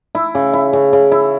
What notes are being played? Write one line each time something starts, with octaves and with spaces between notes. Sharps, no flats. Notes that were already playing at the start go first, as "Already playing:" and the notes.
E4
C#3
E4
C#3
C#3
E4